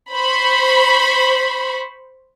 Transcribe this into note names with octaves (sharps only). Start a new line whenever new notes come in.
C5 B5 C#6